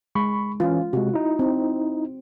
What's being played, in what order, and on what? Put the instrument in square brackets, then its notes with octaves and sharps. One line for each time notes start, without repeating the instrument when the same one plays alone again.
[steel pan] G#3 [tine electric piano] B5 C#6
[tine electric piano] E3 C#4 [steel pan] F4
[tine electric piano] C3 G#3 [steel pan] F#4
[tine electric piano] D#4 E4
[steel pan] C4